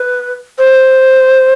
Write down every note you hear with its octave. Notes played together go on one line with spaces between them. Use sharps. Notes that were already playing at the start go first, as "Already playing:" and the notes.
Already playing: B4
C5